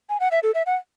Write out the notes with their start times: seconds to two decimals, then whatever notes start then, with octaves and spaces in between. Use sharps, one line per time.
0.09 G#5
0.20 F#5
0.31 E5
0.43 A4
0.55 E5
0.66 F#5